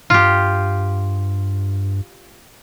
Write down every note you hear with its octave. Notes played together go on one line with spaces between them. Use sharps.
G2 F4 G4